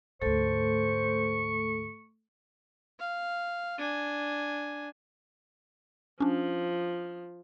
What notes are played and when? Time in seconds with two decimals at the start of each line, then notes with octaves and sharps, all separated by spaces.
0.22 D2 G#2 A3 A4 C5 C#6
2.99 F5
3.78 D4 G#5
6.20 F3 C#4 D4